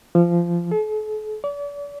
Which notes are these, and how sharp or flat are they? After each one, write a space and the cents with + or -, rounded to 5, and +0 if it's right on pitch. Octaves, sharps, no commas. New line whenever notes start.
F3 -20
A4 -45
D5 -40